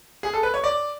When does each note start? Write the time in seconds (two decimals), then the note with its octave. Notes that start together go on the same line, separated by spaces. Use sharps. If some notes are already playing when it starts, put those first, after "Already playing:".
0.23 G#4
0.33 A4
0.43 B4
0.54 C#5
0.64 D5